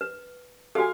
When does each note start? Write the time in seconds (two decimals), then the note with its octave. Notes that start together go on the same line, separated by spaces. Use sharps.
0.01 B4
0.75 F#4 A4 F5 G#5